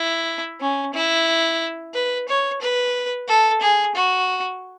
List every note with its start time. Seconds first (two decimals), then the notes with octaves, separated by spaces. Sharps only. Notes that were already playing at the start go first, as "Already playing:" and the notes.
Already playing: E4
0.61 C#4
0.94 E4
1.94 B4
2.28 C#5
2.62 B4
3.28 A4
3.61 G#4
3.95 F#4